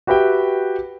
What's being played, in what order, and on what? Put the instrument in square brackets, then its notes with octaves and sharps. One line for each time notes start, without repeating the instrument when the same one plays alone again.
[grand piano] F#4 G4 B4 E5 G5